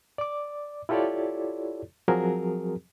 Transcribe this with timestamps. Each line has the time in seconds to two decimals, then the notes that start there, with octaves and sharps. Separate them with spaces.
0.18 D5 D6
0.89 E4 F4 G4 A4 C#5 D5
2.08 F3 F#3 C4 F#4 G#4 A#4